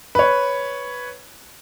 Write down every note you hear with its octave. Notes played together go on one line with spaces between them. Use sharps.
B4 C#5